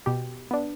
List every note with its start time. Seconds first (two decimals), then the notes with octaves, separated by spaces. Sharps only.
0.06 B2 G4
0.51 B3 D4